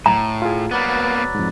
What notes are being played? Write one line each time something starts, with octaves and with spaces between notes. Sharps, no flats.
A2 A#5
F4 G#4
F#3 A#3 B3 B4 D5 A6
F2 G#2